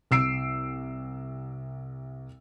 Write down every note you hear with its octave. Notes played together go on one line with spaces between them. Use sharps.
C2 E6 C7 D7